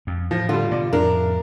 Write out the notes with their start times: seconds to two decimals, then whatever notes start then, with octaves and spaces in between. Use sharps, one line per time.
0.07 F2
0.31 A2 F3 A#6
0.49 D3 G3 F4
0.71 B2 D3 D5
0.93 F2 A2 D4 A#4